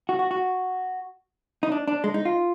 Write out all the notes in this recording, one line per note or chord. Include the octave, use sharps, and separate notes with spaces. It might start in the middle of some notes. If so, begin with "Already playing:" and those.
F#4
F#4
F#4
D#4
D4
D4
G#3
D#4
F4